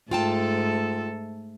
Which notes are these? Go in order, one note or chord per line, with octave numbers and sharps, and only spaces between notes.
G#2 A3 F4 A4 G5 A5